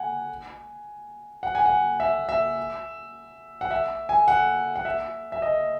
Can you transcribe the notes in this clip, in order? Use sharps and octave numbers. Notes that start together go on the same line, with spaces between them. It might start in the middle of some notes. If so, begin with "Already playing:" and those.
Already playing: F#5 G#5
F#5
G#5
F#5
E5
E5
F#5
E5
G#5
F#5
F#5
E5
E5
D#5